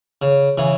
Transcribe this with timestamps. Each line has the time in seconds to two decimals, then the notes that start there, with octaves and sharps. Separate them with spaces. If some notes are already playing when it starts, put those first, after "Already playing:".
0.22 C#3
0.58 C#3 E3